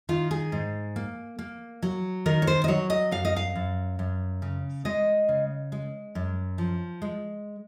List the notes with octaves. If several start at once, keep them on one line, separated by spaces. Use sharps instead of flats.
D#3 F4
G#4
G#2
A#3
A#3
F#3
D#3 A#4
C#5
C5
D#5
F#3 C#5
D#5
F#2 F5
D#5
F5
F#2
F#2
C#3
G#3 D#5
C#3
G#3
F#2
F3
G#3